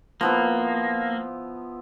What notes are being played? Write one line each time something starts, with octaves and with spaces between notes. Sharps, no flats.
F3 A#3 B3 E4